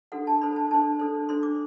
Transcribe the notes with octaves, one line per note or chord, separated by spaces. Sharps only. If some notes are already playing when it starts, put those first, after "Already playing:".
D4 F#4 A4 F#5
A5
D4 A4 C5 B5
A5
D4 A4 C5 A5
D4 A4 C5
D4 A4 C5 C6
D6